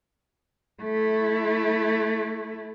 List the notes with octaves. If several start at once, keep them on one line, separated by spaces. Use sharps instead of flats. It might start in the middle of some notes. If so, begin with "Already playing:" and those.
A3 E4